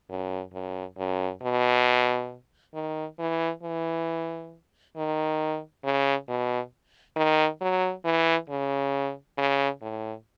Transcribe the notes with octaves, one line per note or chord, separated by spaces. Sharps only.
F#2
F#2
F#2
B2
D#3
E3
E3
D#3
C#3
B2
D#3
F#3
E3
C#3
C#3
A2